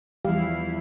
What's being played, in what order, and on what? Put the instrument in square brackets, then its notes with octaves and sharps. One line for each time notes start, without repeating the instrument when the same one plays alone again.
[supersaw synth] E2 E4 [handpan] E3 F3 F5 [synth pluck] G3